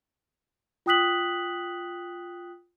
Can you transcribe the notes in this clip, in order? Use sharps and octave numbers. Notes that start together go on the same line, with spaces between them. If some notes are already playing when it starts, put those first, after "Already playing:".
F4 G5 D#6 F#6 B6 F#7